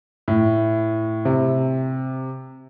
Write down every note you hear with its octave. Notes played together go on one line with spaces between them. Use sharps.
A2
C3